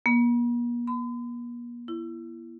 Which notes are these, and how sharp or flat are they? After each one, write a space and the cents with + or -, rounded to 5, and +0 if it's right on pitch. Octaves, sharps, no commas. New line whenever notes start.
A#3 +45
B5 +45
E4 +25